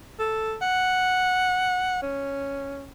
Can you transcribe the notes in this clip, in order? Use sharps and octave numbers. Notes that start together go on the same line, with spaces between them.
A4
F#5
C#4